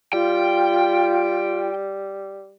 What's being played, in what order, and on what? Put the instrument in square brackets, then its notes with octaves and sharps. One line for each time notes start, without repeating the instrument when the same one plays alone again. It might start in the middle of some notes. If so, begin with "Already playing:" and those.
[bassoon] G3 [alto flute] F4 [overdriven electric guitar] G5